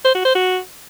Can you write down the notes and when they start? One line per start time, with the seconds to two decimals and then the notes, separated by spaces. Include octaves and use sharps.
0.05 C5
0.15 F#4
0.25 C5
0.35 F#4